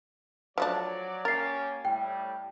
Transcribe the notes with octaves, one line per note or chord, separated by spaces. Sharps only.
F3 F#3 A3 D4 D5
A#3 C#4 G4 A#4 A6 C7
A2 G3 G5